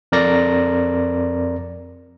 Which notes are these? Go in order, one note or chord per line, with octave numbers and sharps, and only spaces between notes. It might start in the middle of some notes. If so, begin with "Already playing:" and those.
F2 A#4 D5 A#6